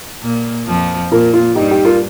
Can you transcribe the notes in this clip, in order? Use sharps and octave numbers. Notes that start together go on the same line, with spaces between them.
A#2 A#3
F2 F3
A#2 A#3 F4 A#4
F4
G2 G3 D#4 G4
D#4 G4
F4 A#4